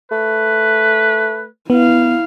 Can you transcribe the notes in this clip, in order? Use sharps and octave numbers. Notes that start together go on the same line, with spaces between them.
A3 B4
B3 E4 F5